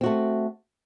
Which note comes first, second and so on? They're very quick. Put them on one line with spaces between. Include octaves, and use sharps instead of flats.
C4 F#4 A3